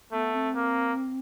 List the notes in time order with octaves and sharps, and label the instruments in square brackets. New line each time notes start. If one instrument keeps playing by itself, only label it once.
[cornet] A3 [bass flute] B3
[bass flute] C4
[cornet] A#3